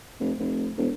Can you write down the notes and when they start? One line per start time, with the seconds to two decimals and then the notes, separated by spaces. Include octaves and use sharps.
0.20 F1
0.39 F1
0.77 E1